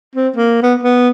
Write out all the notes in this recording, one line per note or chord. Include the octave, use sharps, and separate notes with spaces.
C4
A#3
B3
B3